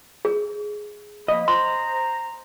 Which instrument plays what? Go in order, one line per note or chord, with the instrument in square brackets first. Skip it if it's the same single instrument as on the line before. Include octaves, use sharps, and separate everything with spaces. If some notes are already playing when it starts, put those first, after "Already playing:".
[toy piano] G#4
[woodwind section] F3 A#3 B5 [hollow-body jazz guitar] D#5
[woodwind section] C5 A#5 [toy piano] C6